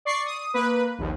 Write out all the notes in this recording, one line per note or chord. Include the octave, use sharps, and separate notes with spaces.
D5 C#6 C7
D#6
A#3 B4
A#1 D#2